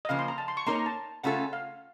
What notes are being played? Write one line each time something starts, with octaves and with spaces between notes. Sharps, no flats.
D#5
C#3 F3 A#3 F5
C6
A#5
A5
C6
C#6
A#3 D#4 A#4 C#5 C6
A#5
A5
C#3 A3 C#4 F4 A4 F#5
F5